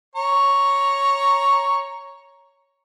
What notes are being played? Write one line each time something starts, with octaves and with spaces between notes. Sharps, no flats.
C#5 A#5